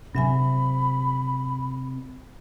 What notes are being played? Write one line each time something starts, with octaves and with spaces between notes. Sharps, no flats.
C3 F#3 E5 G#5 B5